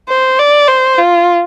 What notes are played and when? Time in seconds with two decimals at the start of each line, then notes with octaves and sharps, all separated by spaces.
0.09 C5
0.39 D5
0.68 C5
0.98 F4